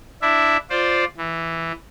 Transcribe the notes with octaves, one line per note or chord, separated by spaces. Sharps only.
D4 E4 E5
F4 C5 D5
E3